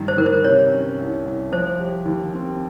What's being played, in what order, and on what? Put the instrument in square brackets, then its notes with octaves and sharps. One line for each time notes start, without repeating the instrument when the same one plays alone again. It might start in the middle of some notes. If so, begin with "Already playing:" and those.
Already playing: [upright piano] G2 D#3
[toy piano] C5
[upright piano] D#3 [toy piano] A#4
[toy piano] C5
[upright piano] C3 [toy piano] C#5
[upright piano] C#4
C2
C2
[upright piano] F3 [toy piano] C5
[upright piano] G4
D#2
C4